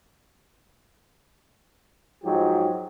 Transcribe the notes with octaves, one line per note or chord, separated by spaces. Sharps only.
G#2 F3 F#3 G4